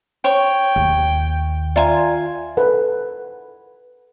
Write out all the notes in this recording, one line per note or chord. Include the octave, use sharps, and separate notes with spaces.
C#5 G5
D#2
F4 D5 E5 G#5 A#5
A4 B4 F#5